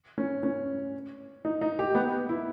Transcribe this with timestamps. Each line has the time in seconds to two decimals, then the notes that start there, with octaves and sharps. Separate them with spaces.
0.18 C#4
0.43 C#4
1.45 D#4
1.61 D#4
1.79 G4
1.95 B3
2.29 E4